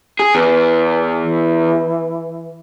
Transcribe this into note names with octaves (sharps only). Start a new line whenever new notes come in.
G#4
E2 B4
E3